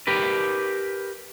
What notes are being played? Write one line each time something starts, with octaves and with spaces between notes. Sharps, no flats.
G4 A#4 B4